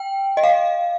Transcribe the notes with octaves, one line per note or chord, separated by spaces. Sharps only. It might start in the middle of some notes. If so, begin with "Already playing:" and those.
Already playing: G5
D#5
F5